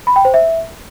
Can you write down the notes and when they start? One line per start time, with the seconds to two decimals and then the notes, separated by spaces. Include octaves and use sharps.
0.07 B5
0.16 G5
0.25 C5
0.34 E5